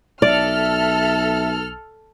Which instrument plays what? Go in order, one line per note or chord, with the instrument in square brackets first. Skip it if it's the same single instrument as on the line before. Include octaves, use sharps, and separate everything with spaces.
[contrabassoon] B1 [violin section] A4 F6 [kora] D5 [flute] E5